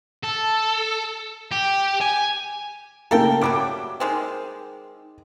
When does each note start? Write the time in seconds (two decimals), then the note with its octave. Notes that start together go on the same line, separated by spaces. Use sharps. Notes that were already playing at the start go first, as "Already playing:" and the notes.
0.24 A4
1.52 G4
2.01 G#5
3.11 C#3 A3 A#3 A4 A#4 G5
3.41 F#3 G3 A3 D6 D7
4.00 D#3 G#3 C4